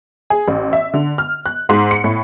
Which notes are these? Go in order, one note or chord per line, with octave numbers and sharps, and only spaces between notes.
G#4
A1
E5
D3
F6
F#6
G#2
C#7
A2